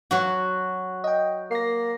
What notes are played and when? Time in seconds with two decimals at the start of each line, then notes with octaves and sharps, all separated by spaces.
0.11 F#3 F#4
1.04 D#5 G5
1.51 A#3 A#6 C7